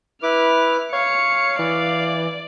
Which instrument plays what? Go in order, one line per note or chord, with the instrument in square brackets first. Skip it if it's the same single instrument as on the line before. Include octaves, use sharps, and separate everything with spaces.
[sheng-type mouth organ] E4 B4 D6 [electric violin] F6
[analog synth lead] C#5 [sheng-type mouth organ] F5 [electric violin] C#7
[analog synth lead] E3 [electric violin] D5